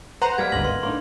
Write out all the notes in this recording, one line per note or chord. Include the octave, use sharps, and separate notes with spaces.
B4 C5 F#5 A#5
G3 A#3 B3 B4 D5 F6 G#6 B6
G1 C#2 G#2 D4 D#5 A#6 F#7
B4 C6
A2 A#3 D4 D#4 C6